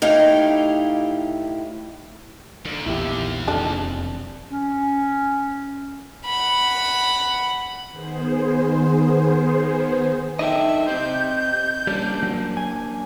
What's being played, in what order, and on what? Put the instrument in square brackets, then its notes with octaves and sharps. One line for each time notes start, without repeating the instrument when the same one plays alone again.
[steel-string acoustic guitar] A2 D#4 E4 G4 F5
[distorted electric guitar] D#2 [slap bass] D3
[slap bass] A#1 E2 F3 [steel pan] E4 G4
[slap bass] E1 F2 C3 [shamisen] D4 A4 A5
[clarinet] C#4
[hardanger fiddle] F#5 B5
[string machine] D#3 B3 G#4 C5
[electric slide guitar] D4 D#4 A4 [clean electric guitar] D#5 G5 [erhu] E5
[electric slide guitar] C4 G4 C5 [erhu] G6
[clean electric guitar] G3 [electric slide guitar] A#3 C#4 D4
[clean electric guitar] F#3
G#5